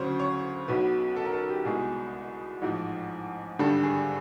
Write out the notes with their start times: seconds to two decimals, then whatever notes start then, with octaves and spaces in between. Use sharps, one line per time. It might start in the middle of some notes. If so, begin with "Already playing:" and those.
Already playing: D2 C#3 F#3 C5 C#5
0.19 C#5
0.68 B1 B2 F#3 B4
1.16 A4
1.25 A#4
1.33 A4
1.49 G4
1.65 C2 B2 G#3 G#4
2.62 A1 G#2 F3
3.59 G#1 G2 D3 G3 A4
3.83 G#4